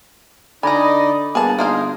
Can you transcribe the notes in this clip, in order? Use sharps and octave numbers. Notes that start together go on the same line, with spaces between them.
D3 D#4 D5 D#5 G#5 A#5 B5
G1 A#3 B3 G#4 A5
A#3 D#4 G#4 C5 F5